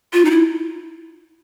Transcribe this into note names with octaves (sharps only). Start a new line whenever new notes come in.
F4
D#4
E4